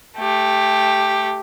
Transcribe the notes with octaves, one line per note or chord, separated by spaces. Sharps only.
A3 G4